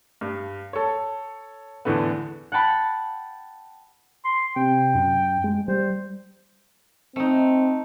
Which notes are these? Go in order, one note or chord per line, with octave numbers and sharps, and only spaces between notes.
G2
A4 C#5
E2 A2 D3 A3 B3
F#5 G5 A5 B5
C6
C3 G5
F#2
G#3
G3 C5
A3 C4 D#4